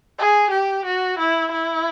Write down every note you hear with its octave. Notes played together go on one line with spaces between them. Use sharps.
G#4
G4
F#4
E4
E4